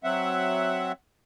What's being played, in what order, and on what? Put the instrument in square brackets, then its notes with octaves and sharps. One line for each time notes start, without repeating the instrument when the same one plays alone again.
[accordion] F#3 C4 E5 F#5